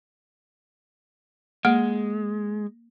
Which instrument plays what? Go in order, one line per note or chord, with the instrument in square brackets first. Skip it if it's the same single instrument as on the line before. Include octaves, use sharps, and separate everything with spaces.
[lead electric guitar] G#3 [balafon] A#3